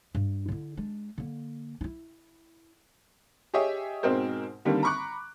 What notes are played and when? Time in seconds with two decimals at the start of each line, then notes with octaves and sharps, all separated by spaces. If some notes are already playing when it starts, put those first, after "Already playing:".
0.15 G2
0.48 D3 E4
0.77 G#3 D4
1.18 D3 A#3
1.81 D#4 E4
3.54 G4 G#4 C#5 D#5 E5
4.03 G#2 B2 G#3 C4 A#4 C5
4.65 D3 D#3 G3 A#3 C4
4.83 A#5 B5 C#6 D6 F#6